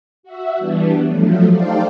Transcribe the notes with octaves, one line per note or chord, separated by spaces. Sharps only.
F#4 E5
E3 G3 B3 D4
F3 F#3 A3
D#4 G4 A4 C5 D5 F5